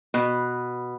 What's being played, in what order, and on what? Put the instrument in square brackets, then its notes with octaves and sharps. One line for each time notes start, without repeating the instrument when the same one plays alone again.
[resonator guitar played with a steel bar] B2